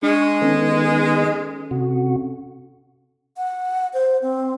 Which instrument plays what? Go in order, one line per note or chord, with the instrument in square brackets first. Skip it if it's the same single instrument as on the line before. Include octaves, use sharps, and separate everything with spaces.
[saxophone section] G#3 [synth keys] D4 [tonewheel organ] C#6
[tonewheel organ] D#3 B3 [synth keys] C#4 A4
[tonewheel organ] C3 F#4
[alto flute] F#5
C5
C4